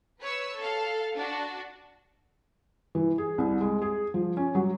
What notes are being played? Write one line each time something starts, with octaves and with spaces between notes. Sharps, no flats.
B4 C#5 E6
A4 F5
D4 F#4
E3
G#4
C2
G#3
G#4
F3
C#4
F#3